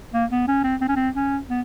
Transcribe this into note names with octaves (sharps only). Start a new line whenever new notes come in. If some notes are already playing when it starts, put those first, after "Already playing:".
A#3
B3
C#4
C4
C4
C#4
C4
C#4
B3